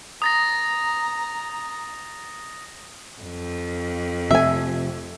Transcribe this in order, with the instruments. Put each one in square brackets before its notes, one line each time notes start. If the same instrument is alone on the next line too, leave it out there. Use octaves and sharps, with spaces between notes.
[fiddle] A#5 [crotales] D#6 A6 A#6
[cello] F2
[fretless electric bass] C3 F3 A3 [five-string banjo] E5 G#5